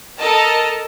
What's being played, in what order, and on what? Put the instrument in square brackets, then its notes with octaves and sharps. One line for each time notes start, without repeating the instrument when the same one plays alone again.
[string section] A4 A#4 D#5 A5